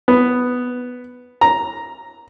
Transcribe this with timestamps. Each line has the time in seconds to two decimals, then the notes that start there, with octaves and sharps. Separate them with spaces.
0.08 B3
1.41 A#5